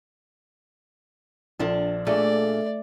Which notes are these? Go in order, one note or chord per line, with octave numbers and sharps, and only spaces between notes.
A#1 F3 D4 A4
A#2 A3 D4 G#4 D5